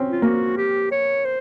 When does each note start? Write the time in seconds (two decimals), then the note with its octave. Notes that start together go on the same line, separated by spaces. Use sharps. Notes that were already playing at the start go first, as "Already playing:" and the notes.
Already playing: C4 C#4
0.11 F4
0.22 A#3 F#4
0.57 G4
0.91 C#5
1.25 C5